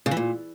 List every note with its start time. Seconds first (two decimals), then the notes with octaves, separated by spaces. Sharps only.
0.06 C#3
0.11 E3
0.17 A#2